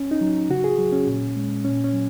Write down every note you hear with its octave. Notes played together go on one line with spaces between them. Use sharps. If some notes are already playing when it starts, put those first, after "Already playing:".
Already playing: C#4
D#4
F#3
C#3 F#4
G#4
F#3
C#4
A#2
G#3
A#2 C#4
C#4
F#3